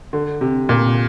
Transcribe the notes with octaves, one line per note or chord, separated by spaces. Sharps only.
D3
C3
A#2